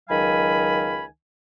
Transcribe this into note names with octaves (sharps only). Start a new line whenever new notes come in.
C#2 D#3 F#3 F5 G#5 B5